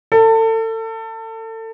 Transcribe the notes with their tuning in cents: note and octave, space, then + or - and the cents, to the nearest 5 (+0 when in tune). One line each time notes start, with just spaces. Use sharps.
A4 +30